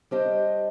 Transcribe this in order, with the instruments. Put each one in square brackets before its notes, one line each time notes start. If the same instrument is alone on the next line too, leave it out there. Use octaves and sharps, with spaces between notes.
[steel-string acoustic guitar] G3 D4 G4 C5 D#5